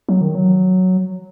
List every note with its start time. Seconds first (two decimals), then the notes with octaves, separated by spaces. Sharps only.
0.09 F#3
0.21 D#3
0.35 F#3